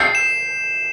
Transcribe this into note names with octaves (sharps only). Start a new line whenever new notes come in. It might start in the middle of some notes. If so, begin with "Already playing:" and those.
Already playing: G6 C7
E7